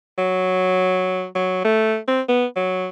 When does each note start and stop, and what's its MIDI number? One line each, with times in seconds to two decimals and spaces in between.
0.18 1.26 54
1.35 1.59 54
1.65 1.98 57
2.08 2.21 60
2.29 2.46 59
2.56 2.88 54